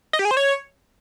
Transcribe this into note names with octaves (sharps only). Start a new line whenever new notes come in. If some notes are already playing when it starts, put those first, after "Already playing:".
D#5
G4
G#4
C5
C#5